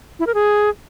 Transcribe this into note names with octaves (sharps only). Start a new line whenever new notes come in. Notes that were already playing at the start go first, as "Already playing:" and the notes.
E4
A#4
G#4